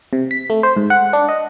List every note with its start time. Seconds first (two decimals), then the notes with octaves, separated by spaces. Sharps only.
0.13 C3
0.31 B6
0.50 A3
0.63 C5
0.77 G#2
0.90 F#5
1.13 D4
1.29 D#5